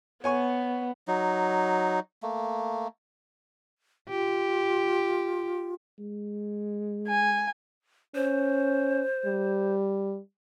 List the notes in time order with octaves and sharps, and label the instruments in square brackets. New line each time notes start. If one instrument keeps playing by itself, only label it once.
[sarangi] B3 [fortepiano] C#5 G#5 C#6
[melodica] F#3 D#4
A3 A#3
[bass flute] F4 [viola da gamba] G4
[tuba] G#3
[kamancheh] G#5
[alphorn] C#4 [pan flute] C5
[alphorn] G3